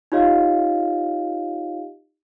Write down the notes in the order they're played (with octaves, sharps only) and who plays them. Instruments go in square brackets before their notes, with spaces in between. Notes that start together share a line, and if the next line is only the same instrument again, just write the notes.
[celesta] D#4 F4 G4 C#5 D#5 F5